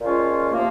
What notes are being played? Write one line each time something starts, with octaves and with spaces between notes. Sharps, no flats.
A#2 F3 G#3 C#4 F4
C3 F3 A#3